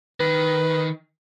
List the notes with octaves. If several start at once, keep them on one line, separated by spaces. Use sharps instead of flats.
D#3 B4